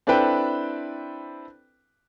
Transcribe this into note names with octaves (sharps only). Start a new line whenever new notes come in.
C4 D4 E4 A4 B4 G5